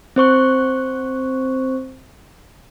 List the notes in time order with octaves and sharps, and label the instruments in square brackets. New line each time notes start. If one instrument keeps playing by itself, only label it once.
[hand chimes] C4 C5 C#6 F#6